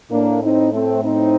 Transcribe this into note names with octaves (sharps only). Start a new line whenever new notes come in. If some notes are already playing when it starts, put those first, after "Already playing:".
A2 A#3 D4
C4 D#4
A3 C4
C4 D#4